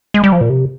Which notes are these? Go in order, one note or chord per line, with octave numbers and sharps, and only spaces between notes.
G#3
G3
F3
A#2
C3